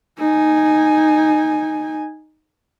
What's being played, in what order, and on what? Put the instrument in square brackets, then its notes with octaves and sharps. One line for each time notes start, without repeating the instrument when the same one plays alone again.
[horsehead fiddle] D#4 G#5